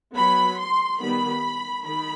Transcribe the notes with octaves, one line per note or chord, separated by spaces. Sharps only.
F#3 B3 B5
C6
D#3 G3 B3 B5
D#3 B5